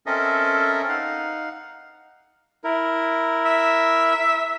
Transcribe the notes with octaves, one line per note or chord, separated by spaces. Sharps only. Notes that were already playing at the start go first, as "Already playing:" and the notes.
C4 C#4 A4 A#4 D#5 E5
D#4 F5 F#5
E4 A#4
E5